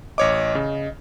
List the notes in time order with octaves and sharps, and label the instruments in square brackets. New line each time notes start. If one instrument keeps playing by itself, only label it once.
[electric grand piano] A1 C#5 D6 [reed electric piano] D#5
[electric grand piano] C#3